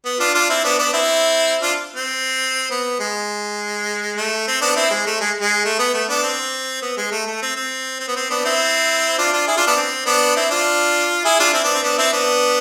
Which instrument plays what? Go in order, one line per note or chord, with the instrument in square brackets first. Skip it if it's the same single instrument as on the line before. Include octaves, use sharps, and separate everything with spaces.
[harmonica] B3
D4 F4
D4 F4
C4 E4
B3 D4
B3 D4
C4 E4
D4 F4
C4
B3
G#3
A3
C4
B3 D4
C4 E4
G#3
A3
G#3
G#3
A3
B3
A3
B3 D4
C4
B3
G#3
A3
A3
C4
C4
C4
B3
C4
B3 D4
C4 E4
D4 F4
D4 F4
E4 G#4
D4 F4
B3 D4
C4
B3 D4
C4 E4
D4 F4
E4 G#4
D4 F4
C4 E4
B3 D4
C4
B3 D4
C4 E4
B3 D4